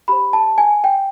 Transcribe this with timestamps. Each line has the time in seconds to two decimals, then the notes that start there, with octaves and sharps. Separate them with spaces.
0.08 G4 C5 B5
0.33 A5
0.58 G#5
0.84 G5